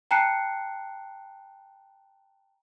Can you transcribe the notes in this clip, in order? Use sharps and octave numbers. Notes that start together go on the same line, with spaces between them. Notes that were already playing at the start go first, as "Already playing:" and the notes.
G5 A5 A#5 F#6 C7 C#7